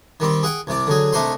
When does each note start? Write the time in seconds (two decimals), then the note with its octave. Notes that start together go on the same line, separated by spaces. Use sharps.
0.20 D#3 G3 C4
0.43 G#4 F#5 G5
0.67 C2 C3 D5
0.87 D3 F#3 G#4
1.13 C2 A3 D4 D#4 C5 C6